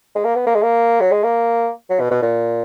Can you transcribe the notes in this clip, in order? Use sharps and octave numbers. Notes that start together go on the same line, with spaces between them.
G#3
A#3
B3
A#3
G#3
A#3
F#3
G#3
A#3
F#3
B2
B2
A#2